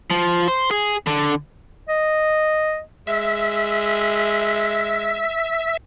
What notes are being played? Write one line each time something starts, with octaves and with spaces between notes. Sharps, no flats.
F3
C5
G#4
D3
D#5
G#3 E5